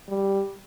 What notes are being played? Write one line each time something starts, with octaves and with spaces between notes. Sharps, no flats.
G3